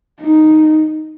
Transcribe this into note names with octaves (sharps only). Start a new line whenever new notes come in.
D#4